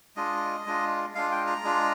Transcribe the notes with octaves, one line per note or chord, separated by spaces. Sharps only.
G#3 D4 F4 D#5
G#3 D4 F4
G#3 D4 F4 F5
G5
A#5
G#3 D4 F4